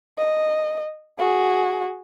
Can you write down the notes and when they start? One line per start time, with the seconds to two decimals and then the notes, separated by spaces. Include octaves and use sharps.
0.18 D#5
1.19 F#4 G#4